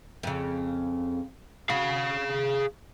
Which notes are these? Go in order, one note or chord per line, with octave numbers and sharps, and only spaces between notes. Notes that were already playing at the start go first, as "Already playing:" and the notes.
F2 C#3
F#4 G#4 F5